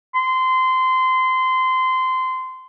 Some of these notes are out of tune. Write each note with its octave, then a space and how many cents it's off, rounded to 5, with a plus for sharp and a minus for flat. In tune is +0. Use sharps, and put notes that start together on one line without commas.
C6 -20